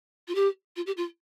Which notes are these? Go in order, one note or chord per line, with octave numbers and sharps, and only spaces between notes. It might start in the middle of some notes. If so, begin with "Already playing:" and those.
F4
G4
F4
G4
F4